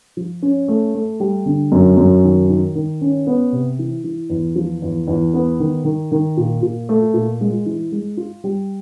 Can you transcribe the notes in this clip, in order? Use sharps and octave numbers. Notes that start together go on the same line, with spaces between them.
F3
C#4
A3
A3
G3
D3
F#2
F#2
D#3
D#3
D#3
C#4
B3
C3
E3
E3
E2
F3
E2
E2
B3
D#3
D#3
D#3
A#2
A#2
A3
A#2
G#3
E3
G#3
F4
G3